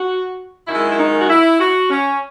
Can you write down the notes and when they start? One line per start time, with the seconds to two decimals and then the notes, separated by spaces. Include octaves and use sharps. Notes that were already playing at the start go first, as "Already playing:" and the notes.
Already playing: F#4
0.68 F#2 D#3 G#3 E4
0.92 E4
0.98 D#4
1.21 F#4
1.29 E4
1.60 F#4
1.90 C#4